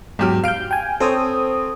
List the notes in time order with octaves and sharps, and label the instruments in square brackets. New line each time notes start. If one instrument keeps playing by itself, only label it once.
[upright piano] E2 G4 F6 [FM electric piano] G#2 F#3
[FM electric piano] F5 G6 [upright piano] F6 D7
[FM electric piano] G5 G#5
[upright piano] C4 C#5 [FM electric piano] A4 C5 D#6